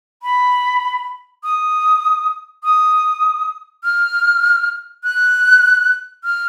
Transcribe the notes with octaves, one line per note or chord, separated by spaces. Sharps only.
B5
D#6
D#6
F6
F#6
F6